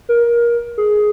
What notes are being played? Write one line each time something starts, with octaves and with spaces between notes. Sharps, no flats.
A#4
G#4